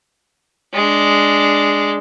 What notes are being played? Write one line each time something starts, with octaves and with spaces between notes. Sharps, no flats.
G#3 D4